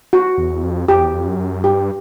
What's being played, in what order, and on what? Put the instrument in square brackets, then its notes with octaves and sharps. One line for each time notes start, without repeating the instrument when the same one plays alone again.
[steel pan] F#4
[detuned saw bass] E2
F2
[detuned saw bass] F2 [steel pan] G4
[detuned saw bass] E2
F2
F#2
[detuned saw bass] G2 [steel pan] G4